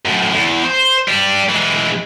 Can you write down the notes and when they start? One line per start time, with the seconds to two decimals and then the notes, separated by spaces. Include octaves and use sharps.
0.05 F#2 A2
0.34 E2
0.64 C5
1.08 G3 D4
1.49 E3 G#3